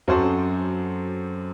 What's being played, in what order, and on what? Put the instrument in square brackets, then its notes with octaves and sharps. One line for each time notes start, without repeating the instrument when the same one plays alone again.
[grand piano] F#2 [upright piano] F#3 C4 F#4 A4 C5